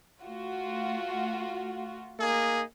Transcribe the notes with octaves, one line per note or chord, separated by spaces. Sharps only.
A3 F4 F#4
A#3 D#4 G#4